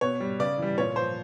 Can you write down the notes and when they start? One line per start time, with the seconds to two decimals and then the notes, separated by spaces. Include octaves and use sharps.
0.01 B2 C#5
0.20 G3
0.39 C#3 D5
0.58 E3 G3
0.78 A#2 C#5
0.96 F3 C5